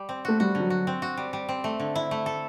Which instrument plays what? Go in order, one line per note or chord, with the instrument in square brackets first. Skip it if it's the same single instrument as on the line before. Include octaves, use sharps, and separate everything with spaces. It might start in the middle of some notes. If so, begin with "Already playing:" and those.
Already playing: [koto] G3
C4
[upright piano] A3 [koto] F#4
[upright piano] G3 [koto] F#4
[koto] D3
[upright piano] F#3
[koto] F#4
C4
F#4
G3
G3
C4
A3
D3
E4
A3
A4